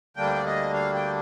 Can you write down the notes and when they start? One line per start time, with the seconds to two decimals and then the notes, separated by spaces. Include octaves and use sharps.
0.16 D2 D3 G3 A#3 D4 G5
0.36 D5
0.46 D#5
0.74 F5
0.94 G5